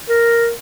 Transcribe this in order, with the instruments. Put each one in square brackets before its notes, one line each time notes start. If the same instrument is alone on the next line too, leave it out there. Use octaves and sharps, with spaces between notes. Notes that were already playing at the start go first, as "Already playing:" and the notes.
[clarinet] A#4